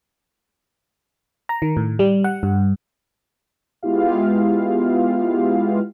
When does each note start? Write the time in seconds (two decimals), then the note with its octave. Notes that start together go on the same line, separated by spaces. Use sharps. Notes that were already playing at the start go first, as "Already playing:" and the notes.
1.49 A#5
1.62 D#3
1.77 A2
1.99 G3
2.24 F#5
2.43 G2
3.83 G#3 B3 E4 F4 G4 F5